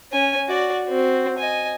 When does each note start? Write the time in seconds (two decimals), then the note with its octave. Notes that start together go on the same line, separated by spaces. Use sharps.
0.12 C#4 G#5
0.48 F#4 D5
0.86 C4 F#4
1.38 D#5 G#5